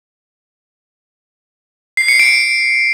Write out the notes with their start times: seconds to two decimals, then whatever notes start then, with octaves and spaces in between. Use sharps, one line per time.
1.97 C7
2.08 C#7
2.19 D7